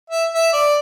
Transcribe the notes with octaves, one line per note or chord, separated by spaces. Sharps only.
E5
E5
D5